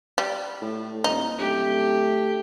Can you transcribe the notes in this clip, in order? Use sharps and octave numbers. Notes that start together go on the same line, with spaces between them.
G3
A2
D#1 D#4
D1 A3 G4